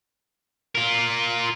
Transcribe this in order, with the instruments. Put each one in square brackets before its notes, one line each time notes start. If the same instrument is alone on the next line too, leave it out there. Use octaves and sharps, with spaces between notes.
[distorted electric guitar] F4 A#4